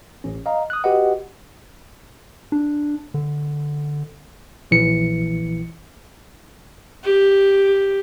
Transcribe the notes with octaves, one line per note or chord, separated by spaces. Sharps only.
A1 C#4
D#5 F5 A#5
D#6 F#6
F#4 G4 B4 D#5 F#5
D4
D3
A#1 E3 C#7
G4